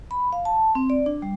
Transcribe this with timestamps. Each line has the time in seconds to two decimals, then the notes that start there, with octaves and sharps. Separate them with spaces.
0.11 B5
0.33 F5
0.45 A5
0.75 C4
0.90 D5
1.06 D4
1.22 G3